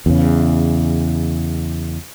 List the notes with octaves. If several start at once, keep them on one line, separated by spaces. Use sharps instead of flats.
E2 C#3